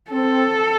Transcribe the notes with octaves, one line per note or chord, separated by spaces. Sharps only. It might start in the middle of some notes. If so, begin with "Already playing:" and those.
C4 A4